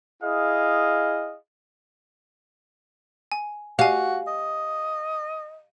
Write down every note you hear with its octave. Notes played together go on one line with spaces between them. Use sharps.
E4 G#4 D#5 F5
G#5
F#4 G4 F5 G#5
D#5